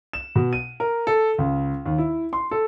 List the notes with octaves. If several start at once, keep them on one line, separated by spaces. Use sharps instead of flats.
E7
B2
D#7
A#4
A4
C#2
D#2
E4
C6
A4